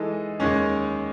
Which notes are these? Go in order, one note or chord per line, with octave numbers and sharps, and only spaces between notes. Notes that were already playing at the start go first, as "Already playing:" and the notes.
Already playing: E3 G#3 D#4 A4 D#5
D#2 D#3 G#3 C#4